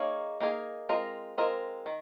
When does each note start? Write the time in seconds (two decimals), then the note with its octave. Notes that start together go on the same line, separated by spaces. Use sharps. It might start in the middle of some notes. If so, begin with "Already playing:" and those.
Already playing: A#3 D#4 G#4 C#5 F5
0.40 A#3 D#4 G#4 C#5 F5
0.89 G#3 C4 F4 A#4 D#5
1.38 G#3 C4 F4 A#4 D#5
1.86 D#3